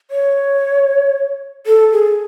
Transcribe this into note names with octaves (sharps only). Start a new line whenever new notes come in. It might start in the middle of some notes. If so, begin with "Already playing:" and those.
C#5
A4
G#4